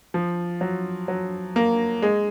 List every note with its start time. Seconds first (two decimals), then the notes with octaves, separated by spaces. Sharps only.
0.14 F3
0.61 F#3
1.08 F#3
1.56 A#3
2.02 G#3